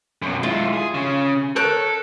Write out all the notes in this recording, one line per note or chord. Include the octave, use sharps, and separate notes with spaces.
F#2 B2
G#3 E4 F4
G#4
C#3
A4 A#4 C#5 F#6